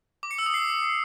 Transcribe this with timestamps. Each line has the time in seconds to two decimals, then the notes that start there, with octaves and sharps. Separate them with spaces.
0.23 D6
0.31 C#7
0.38 E6
0.46 D#6
0.54 C7